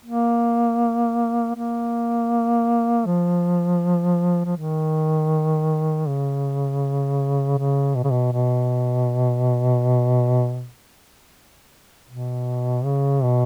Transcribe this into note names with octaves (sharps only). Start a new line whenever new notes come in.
A#3
A#3
F3
F3
D#3
C#3
C#3
B2
C#3
B2
B2
B2
C#3
B2